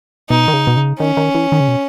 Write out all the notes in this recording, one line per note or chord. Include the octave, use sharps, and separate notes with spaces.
B2 D#4
D#3
C#3
B2
C#3
D#3 C#4
D#3
E3
D#3
C#3
B2